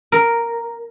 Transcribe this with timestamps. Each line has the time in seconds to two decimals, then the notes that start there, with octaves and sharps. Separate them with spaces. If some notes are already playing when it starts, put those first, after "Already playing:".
0.12 A#4